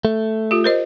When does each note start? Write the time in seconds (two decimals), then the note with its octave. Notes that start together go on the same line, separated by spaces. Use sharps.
0.05 A3
0.51 F4 G4
0.64 A#4 C5 D#5